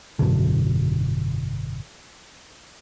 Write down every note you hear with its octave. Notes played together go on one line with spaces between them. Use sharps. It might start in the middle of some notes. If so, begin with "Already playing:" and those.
G#1 F#2 B2 D3